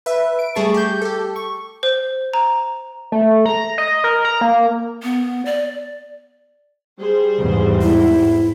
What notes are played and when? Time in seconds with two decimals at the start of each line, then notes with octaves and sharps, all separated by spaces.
0.06 B4 E5
0.39 D7
0.55 G3 A3 G#4 A5 C#6
0.74 G4 G6
1.02 G4 A4
1.36 C#6
1.83 C5
2.33 A#5
3.12 A3
3.46 A#5
3.78 D#5
4.04 A#4
4.25 A#5
4.41 A#3
5.03 B3
5.45 D5
6.98 G3 G#4 C5
7.38 E2 G#2
7.82 E4